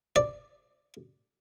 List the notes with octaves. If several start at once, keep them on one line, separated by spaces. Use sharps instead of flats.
D5